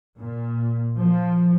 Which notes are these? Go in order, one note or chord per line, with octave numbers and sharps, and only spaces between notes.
A#2
F3